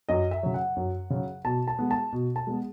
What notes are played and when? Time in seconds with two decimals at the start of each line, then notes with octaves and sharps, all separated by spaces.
0.09 F#2 D#5
0.31 E5
0.43 C#3 F#3
0.54 F#5
0.76 F#2
1.10 C#3 F#3
1.45 B2 A5
1.68 A5
1.79 G#3 B3
1.91 A5
2.13 B2
2.36 A5
2.47 G#3 B3